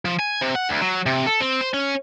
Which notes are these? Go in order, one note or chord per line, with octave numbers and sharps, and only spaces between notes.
F3
G#5
C3
F#5
D2
F#3
C3
A4
C4
C5
C#4